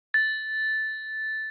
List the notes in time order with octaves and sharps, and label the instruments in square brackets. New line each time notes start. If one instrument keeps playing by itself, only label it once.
[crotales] A6